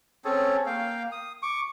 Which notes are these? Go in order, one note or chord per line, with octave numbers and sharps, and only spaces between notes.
C4 C#4 G#4 A4
A#3 F5 G5
D#6
C#6 D6